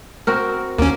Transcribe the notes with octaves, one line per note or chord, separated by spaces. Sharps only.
C4 F#4 A#4
D#2 A#3 C#4